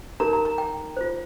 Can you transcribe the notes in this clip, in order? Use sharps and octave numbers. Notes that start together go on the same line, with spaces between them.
D#4 G4 A#4 A#5
A#5
A#5
G5
F4 C5